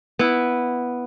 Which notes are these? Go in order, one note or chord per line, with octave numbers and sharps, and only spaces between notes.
B3 E4